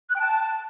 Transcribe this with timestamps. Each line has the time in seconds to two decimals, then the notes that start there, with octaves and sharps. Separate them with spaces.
0.09 F#6
0.14 G5
0.20 A5